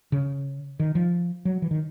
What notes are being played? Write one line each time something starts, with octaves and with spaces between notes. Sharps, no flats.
C#3
D#3
F3
F#3
E3
D#3